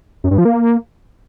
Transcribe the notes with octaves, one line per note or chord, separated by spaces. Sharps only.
F#2
G2
F3
A#3